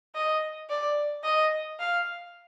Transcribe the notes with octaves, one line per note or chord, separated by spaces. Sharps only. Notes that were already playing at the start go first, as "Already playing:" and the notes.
D#5
D5
D#5
F5